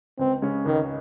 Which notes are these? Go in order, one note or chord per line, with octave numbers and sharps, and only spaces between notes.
C#2 C4
C#3 G#3 C#4
C#2 D#3